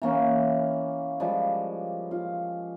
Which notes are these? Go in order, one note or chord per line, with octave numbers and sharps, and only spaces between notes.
E3 A#3 C#4
F3 G3 G#3
F4